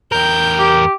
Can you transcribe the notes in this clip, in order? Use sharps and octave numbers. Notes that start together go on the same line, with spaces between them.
E2 A#4 G5 G6
G4